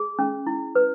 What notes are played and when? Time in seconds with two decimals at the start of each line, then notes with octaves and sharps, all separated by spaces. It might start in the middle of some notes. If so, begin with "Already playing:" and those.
Already playing: G#4
0.19 C#4
0.47 E4
0.75 B4